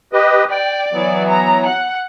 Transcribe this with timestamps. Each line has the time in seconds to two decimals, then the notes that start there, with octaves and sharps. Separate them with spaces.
0.13 G4 B4 D#5
0.50 D5 G5
0.92 E3 F#3 B3
1.28 A#5
1.67 F#5